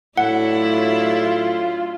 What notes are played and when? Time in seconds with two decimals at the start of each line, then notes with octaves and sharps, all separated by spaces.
0.17 A2 F#3 D4 E4 F#5
0.59 F4